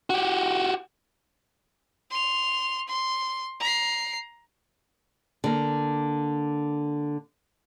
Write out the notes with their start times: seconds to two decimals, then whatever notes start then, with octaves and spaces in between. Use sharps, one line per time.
0.10 F#4 G4
2.11 C6 F7
2.88 C6
3.60 A#5 C7
5.44 D3 A#3